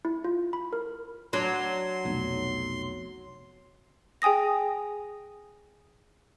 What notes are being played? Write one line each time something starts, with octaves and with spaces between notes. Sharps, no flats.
E4
F4
B5
A#4
F#3 D4 C6
F1 B1
G#4 G5 G#5 D#6 A#6